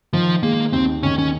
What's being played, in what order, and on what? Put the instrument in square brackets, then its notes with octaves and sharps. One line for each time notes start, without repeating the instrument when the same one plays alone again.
[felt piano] D#3 [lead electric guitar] F3
[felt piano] G#3 [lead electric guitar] A#3
[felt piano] D#2 [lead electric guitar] C4
[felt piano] D#3 [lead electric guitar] C#4
[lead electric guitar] C#4